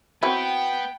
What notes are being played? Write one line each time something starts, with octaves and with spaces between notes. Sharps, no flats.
F#3 B3 C4 E4 G5